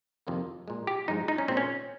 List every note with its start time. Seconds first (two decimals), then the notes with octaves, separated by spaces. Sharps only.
0.27 F2 C3 D#3 A#3
0.68 A#2 G#3
0.87 G4
1.08 G2 F3 G#3 D#4
1.28 D#4
1.38 C#4
1.48 A#2 G#3 C4
1.57 C#4